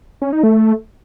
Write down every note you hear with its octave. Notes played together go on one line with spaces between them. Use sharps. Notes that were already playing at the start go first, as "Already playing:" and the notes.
C#4
D#4
A3
A3